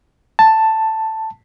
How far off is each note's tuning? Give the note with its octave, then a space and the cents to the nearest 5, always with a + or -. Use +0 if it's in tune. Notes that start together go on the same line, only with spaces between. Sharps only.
A5 +5